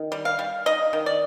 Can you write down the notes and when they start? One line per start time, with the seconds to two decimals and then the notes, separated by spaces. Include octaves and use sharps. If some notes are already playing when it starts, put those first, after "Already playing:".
Already playing: D#3
0.12 G3
0.25 F5
0.39 G3
0.66 D#4 D#5
0.93 D#3
1.06 D5